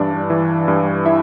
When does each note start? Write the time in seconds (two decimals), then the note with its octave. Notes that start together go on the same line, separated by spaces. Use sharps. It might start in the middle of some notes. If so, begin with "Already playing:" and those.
Already playing: G2 E3 D4 D5
0.30 E3
0.68 G2
1.06 E4 E5